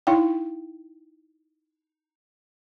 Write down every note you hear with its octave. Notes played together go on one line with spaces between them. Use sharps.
D#4 E4 F5 G5